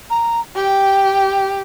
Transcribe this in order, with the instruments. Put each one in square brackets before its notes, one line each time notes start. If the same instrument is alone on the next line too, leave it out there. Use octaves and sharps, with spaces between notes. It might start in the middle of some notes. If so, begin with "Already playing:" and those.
[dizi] A#5
[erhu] G4 [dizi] G5